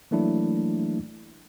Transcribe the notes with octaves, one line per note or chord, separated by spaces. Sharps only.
E3 F#3 A3 A#3 D4 E4